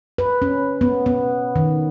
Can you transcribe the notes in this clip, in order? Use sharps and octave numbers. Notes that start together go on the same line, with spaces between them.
B4
C#4
B3
B3
D#3